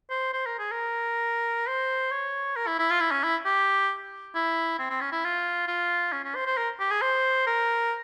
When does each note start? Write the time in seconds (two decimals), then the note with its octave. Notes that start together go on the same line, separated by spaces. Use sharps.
0.11 C5
0.34 C5
0.47 A#4
0.59 G#4
0.72 A#4
1.68 C5
2.12 C#5
2.56 A#4
2.67 E4
2.79 E4
2.90 F4
3.00 E4
3.12 C#4
3.24 E4
3.45 G4
4.35 E4
4.79 C4
4.90 C4
5.01 C#4
5.12 E4
5.25 F4
5.68 F4
6.13 C#4
6.25 C#4
6.35 C5
6.46 C5
6.58 A#4
6.80 G4
6.91 G#4
7.02 C5
7.47 A#4